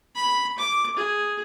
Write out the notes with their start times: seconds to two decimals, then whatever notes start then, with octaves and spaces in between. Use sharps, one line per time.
0.16 B5
0.58 D6
0.96 G#4